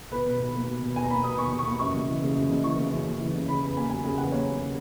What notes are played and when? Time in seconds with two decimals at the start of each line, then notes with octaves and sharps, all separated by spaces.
0.11 B2 B4
0.26 B1
0.39 B1
0.54 A#3
0.68 B2
0.82 B1
0.96 B1 G#5
1.03 A#5
1.10 A#3 B5
1.24 B2 D#6
1.37 B1 C#6
1.52 B1
1.59 C#6
1.65 A#3
1.79 F#2 C#6
1.94 F#1
2.09 E3
2.22 C#3
2.35 F#2
2.50 F#1
2.64 E3 C#6
2.78 C#3
2.92 F#2
3.07 F#1
3.20 E3
3.34 C#3
3.48 C#3 B5
3.62 E2
3.77 A#3 G#5
3.90 F#3 G#5
4.04 C#3 G#5
4.18 E2 F#5
4.32 A#3 C#5
4.46 F#3
4.60 C#3